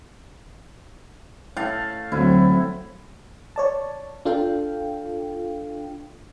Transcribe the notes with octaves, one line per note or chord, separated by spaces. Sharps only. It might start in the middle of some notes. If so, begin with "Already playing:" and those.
A2 F5 A5
D2 F#3 C4 E4
C#5 D5 A5
D4 F4 A4 F5 G5